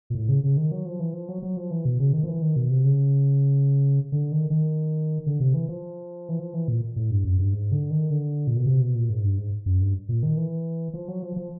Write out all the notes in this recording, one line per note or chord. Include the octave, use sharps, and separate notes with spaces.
A#2
A2
C#3
C#3
D#3
F#3
F3
E3
F3
F#3
F#3
F3
E3
B2
C#3
D#3
F3
E3
D#3
B2
C3
C#3
D3
D#3
D#3
D3
C3
E3
F3
E3
F3
E3
A#2
A2
G2
F#2
G2
G#2
D3
D#3
D3
A#2
B2
C3
B2
A#2
G#2
G2
G#2
F#2
G2
A#2
D#3
E3
F3
F#3
F3
F3